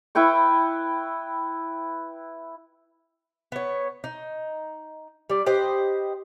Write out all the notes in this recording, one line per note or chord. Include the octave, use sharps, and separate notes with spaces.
E4 B4 G5 C#6
B3 C#5
D#4
G3 D5
G4 B4 C5 D#5